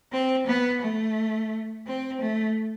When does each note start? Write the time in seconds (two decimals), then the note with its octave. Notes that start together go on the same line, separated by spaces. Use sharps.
0.11 C4
0.46 B3
0.80 A3
1.85 C4
2.20 A3